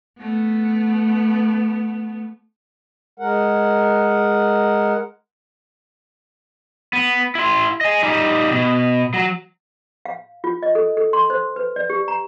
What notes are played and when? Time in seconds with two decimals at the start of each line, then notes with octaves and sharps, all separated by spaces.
0.19 A3 B3
3.20 G#3 A#4 F#5
6.93 B3
7.35 E4 C6
7.81 D#5 G#5
8.03 G3 D#4
8.51 B2
9.13 F#3
10.05 F5
10.44 F4
10.63 D#5
10.75 A4
10.97 A4
11.13 C6
11.30 C5
11.56 B4
11.76 D5
11.90 G4
12.08 A#5